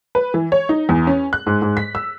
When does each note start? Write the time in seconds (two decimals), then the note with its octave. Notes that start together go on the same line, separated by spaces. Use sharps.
0.15 B4
0.34 E3
0.52 C#5
0.69 D#4
0.89 E2
1.07 C#4
1.33 F#6
1.47 G#2
1.62 G#2
1.77 B6
1.95 E6